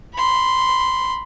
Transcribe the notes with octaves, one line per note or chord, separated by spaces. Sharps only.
B5 C6